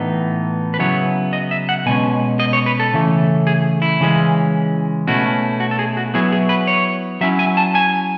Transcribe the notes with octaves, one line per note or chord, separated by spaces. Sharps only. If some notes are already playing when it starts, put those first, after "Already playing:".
Already playing: A2 E3 B3 D#4
B4
C#3 F#3 B3 E4 C#5
D#5
E5
F#5
B2 G#3 C#4 G#5
D#5
C#5
B4
A4
C#3 E3 A3
G#4
E4
C#3 E3 G#3 C#4
B2 A3 C#4 E4 F#4
F#4
A4
G#4
F#4
F#3 B3 E4 G#4
G#4
B4
C#5
F#3 C#4 E4 E5
G#5
A5
G#5